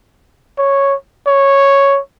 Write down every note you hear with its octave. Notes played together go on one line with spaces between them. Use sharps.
C#5
C#5